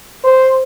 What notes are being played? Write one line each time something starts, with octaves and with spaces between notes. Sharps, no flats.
C5